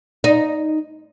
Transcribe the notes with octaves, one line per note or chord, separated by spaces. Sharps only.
D#4